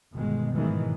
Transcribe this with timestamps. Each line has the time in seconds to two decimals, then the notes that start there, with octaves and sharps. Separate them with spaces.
0.12 G1 B2 D#3 G#3
0.54 G#2 B2 D#3 E3 F#3 G#3